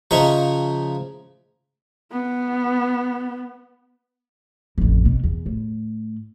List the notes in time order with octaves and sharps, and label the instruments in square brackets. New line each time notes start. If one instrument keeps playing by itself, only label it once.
[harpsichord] C#3 F3 D#5 E5 A#5 C#6
[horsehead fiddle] B3
[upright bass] A1 F2
B2
E2
A2